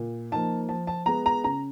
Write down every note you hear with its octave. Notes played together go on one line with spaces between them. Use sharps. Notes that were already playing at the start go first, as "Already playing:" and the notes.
Already playing: A#2
F3 A#3 D#4 A5
F3 A5
A5
G#3 B3 A#5
A#5
C#3 A#5